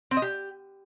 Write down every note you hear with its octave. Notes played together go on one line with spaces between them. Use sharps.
C4
D#5
G4